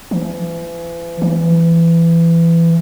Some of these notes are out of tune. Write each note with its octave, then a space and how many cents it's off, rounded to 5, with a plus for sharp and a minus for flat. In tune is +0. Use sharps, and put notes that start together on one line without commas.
E3 +40
E3 +20